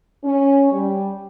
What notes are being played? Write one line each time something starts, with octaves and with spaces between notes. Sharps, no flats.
C#4
G3